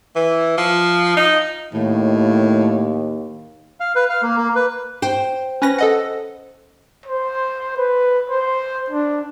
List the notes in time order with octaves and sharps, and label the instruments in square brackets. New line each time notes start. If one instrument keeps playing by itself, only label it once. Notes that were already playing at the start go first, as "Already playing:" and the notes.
[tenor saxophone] E3
F3
D#4
[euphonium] D#2 [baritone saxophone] A2
[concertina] F5
B4
F5
A#3
A#3
B4
[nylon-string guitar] C5 G5
[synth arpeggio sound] C#4 B4 A#6
A4 D#5 F#5
[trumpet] C5
B4
C5
D4